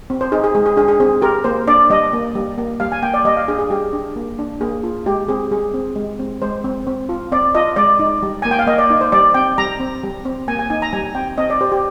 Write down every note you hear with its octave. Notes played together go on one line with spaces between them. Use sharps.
C4
C5
D#4 G#4
G#4
G#3 G#4
G#4
D4 G#4
G#4
C4 G#4
G4 A#4
A#3 C5
D4 D5
G3 D#5
A#3
G3
A#3
G3 F5
G#5
A#3 G5
D5
G3 D#5
F5
D4 G#4
G#4
G3 G4
D4
A#3
D4
A#3 G#4
F4
G#3 G4
C4 G#4
G3 G#4
C4
G#3
C4
G#3 C5
C4
C4
F4
C4 D5
F4 D#5
G#3 D5
D#4
G3
A#3 G#5
G5
F5
A#3 D#5
D5
D#4
C5
G3 D5
C4 G5
G3 A#5
C4
G3
C4
A#3 G#5
G#5
D#4 G#5
A#5
G3 G#5
C4 G5
C4 D#5
D5
G4 C5
G4